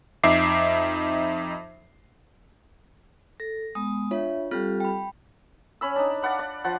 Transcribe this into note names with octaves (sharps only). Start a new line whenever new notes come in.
F2 D#4 E5 D6 C7
A4 A#6
G#3 B3 D#6
D4 F4 C#5 E5
G3 C4 F4 G4 A4 F6
G5 B5
C#4 B5 E6
D4 D#4
D5 F5 F#5 B5
D5
F3 F#5